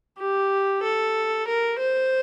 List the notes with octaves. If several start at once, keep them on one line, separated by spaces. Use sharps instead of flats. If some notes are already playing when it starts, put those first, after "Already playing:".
G4
A4
A#4
C5